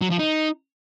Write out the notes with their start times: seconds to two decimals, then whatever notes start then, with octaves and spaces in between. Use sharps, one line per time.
0.02 F#3
0.10 F3
0.19 D#4